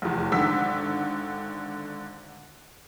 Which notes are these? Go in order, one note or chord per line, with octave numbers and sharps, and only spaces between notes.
F1 E2
G#1 D3 D#3 E6 B6